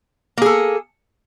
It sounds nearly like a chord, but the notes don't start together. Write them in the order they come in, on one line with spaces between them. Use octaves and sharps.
A#3 G#4 A4